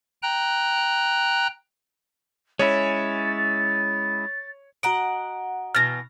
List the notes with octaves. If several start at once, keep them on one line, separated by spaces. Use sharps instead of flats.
G5 A#5 F#6
G#3 C#4 E4 C#5 A6
F#4 D#5 F#5 A#5 D7
B2 E3 F6 A6 A#6